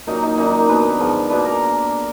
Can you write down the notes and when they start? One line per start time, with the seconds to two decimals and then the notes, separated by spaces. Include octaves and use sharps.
0.07 A#2 F#3 A#3 D#4
0.23 D#4
0.38 F#2 D#3 A#3 D4 D#4
0.69 B2 F#3 B3 B4
0.99 G#2 F3 B3
1.30 B2 A#3 D4 B4
1.45 A#4